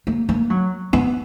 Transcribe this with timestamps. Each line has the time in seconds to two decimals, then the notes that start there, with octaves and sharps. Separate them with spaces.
0.07 A#3
0.29 A#3
0.50 F#3
0.93 B3